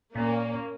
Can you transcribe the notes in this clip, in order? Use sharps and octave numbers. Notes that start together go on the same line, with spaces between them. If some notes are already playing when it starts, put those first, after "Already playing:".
A#2 A#3 C#4